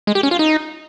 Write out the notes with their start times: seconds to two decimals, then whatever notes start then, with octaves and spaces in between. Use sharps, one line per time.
0.07 G#3
0.15 G4
0.23 C#4
0.31 F4
0.39 D#4